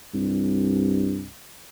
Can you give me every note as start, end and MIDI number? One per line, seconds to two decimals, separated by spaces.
0.14 1.30 36
0.14 1.24 43